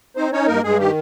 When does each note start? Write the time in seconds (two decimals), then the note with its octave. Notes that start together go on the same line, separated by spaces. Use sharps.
0.16 C4 D#4 C5
0.32 C#4 D#4 C#5
0.48 G2 A#3 A#4
0.64 G2 G#3 G#4
0.79 D#3 G4